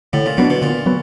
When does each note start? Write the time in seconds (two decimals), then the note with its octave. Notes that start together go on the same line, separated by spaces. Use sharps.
0.13 A2 D3
0.26 A#2
0.37 B2 F#3 B3 D4
0.50 B2
0.62 A#2 D3
0.86 F#3 B3